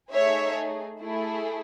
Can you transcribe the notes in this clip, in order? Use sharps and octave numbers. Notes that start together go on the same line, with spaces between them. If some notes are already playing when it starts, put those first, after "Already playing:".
A3 D#4 G#4 C#5 E5
A3 E4 G#4